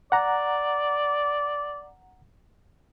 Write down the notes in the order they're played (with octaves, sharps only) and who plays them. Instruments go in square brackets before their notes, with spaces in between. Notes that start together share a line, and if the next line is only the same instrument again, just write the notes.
[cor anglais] D5 [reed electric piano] F#5 A#5